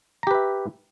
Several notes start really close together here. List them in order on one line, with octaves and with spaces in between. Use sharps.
A#5 G4 B4 E5